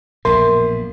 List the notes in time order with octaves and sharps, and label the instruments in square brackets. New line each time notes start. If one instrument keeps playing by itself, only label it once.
[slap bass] A#1 F#2 B2 [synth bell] A#4 [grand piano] C6